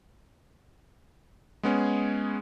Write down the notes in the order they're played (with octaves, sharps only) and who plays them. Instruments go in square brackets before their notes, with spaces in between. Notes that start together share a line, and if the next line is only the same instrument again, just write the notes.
[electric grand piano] G#3 B3 C#4 G#4